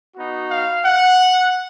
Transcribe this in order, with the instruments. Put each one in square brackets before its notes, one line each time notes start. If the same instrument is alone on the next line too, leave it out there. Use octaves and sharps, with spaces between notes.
[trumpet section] B3 D#4 F#4
F5
F#5